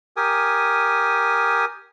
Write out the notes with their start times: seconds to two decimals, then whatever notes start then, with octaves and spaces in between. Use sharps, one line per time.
0.17 G4 A#4 G#5 D#6